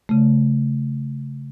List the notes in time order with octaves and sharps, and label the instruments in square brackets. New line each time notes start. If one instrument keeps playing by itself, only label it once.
[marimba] C#3 A3